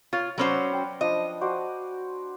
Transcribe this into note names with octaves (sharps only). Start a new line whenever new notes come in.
F4 C#5
F#3 C#4 B4 C5 D5 F#5
G5
F3 D4 F4 D#5
F#4 C5 D5